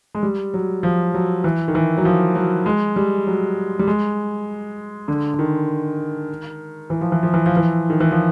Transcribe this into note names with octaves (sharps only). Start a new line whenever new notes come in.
G#3
G3
F#3
F3
F#3
E3
D#3
E3
F#3
F3
F#3
G#3
G3
F#3
G3
G#3
D3
D3
D#3
E3
F3
E3
F3
E3
F3
E3
D#3
E3
F3